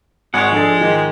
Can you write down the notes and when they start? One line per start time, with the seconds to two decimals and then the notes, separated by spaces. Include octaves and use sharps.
0.34 G#1 G#3 C#5 F#5
0.52 F3 D4 G#4 A4 A6
0.81 G#2 D#3